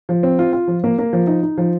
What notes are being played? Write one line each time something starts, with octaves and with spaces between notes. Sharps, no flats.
F3
C4
F4
F4
F3
A#3
A#3
F3
D#4
D#4
F3